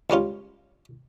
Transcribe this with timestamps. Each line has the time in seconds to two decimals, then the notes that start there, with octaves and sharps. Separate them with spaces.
0.10 C#2 G3 C#4 F4